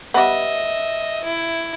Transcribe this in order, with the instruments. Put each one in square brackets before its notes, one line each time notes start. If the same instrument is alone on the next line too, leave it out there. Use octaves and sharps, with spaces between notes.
[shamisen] G3 B3 [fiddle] D#5 E5
[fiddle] E4